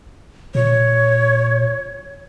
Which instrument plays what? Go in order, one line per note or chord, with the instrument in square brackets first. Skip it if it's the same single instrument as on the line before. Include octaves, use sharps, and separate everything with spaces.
[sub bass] A#2 [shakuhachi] C#5